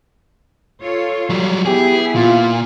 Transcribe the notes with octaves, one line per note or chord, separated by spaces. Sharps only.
F4 A4 C#5
F#3 G3
B3 E4 G4 G#4
A#2 F4